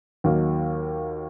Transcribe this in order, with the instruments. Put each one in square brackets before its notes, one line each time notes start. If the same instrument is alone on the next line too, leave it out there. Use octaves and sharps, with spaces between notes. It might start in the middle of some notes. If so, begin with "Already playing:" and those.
[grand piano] D#2 D#3 F#3 A#3